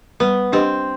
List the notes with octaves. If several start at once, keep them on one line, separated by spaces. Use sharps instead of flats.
G3 B3
C4 D4 G4 B4 D#5